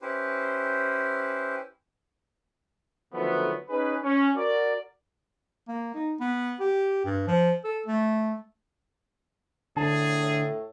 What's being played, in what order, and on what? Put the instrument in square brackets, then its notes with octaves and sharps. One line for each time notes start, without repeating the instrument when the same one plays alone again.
[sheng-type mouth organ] C#4 E4 G4 B4 C5
[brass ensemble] D3 D#3 F3 F#3 A3 B3
C#4 D#4 G#4 B4
C#4
F#4 A#4 D5
[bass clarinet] A#3
D#4
B3
G4
G2
F3
A4
A3
[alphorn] A2 [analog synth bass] D3 [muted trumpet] G#4 [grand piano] A5